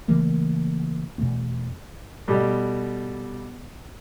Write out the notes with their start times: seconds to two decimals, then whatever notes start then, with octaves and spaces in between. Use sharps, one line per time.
0.08 C#3 E3 A3 A#3
1.18 E2 B2 A3 C4
2.27 B2 G3 A3